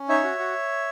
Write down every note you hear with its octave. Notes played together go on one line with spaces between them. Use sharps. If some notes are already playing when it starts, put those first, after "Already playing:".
Already playing: C#4
D#4 C#5 E5
F#4
F#4